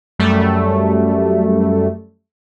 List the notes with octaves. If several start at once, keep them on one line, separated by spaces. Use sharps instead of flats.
F#2 G3 A3